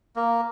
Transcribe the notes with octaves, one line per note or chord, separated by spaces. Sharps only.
A#3